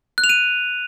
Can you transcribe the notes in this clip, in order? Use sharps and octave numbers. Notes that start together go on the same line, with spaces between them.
F#6
F7
D#7